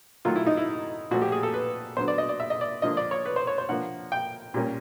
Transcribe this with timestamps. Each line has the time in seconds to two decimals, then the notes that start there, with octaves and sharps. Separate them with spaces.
0.25 D#3 F#3 A3 F4
0.36 E4
0.46 D#4
0.57 E4
1.11 A#2 F3 A3 F#4
1.22 G4
1.32 G#4
1.43 A4
1.54 B4
1.97 D3 F#3 B3 C5
2.08 D5
2.18 D#5
2.29 D5
2.40 E5
2.50 D#5
2.61 D5
2.82 D3 F3 A#3 D4 D#5
2.97 D5
3.11 C#5
3.26 B4
3.36 C5
3.47 C#5
3.58 C5
3.69 F3 A#3 D4 F#5
4.12 G5
4.54 A#2 G3 A#3 C#4